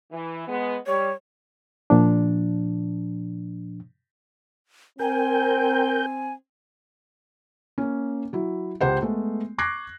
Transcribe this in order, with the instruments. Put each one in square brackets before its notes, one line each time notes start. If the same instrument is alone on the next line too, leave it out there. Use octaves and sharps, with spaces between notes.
[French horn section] E3
G#3 B3
[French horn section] G3 [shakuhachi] C#5
[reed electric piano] A#2 F3 D4
[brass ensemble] C4 [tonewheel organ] A#4 G5 G6 [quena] G#5
[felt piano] A#3 C#4
F#3 E4
C#2 G4 C5 F#5
G#3 A3 B3
C#6 D6 F#6 G#6 A#6 C7